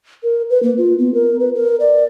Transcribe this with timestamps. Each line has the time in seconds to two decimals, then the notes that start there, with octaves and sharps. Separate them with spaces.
0.23 A#4
0.50 B4
0.63 A#3
0.78 F4
0.98 B3
1.14 A#4
1.40 B4
1.55 A#4
1.80 D5